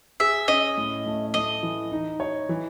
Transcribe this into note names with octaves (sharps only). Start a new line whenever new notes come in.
G#4 E5
C#4 D#5
A2
A3
A3 D#5
E3
D#4
C#5
E3